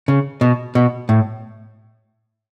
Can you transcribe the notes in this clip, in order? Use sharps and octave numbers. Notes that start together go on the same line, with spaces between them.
C#3
B2
B2
A2